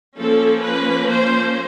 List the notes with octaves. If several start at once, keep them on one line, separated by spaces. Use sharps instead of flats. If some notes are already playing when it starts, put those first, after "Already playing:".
F3 A#3 C#4 A4
B4
C5